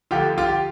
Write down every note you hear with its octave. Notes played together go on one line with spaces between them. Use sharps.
D2 D3 F3 F4 G4
F4 G4
G4